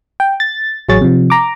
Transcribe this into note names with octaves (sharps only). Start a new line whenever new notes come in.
G5
A6
A1 F#3 G#4 C#5 A6
C3 F3
A#5 D6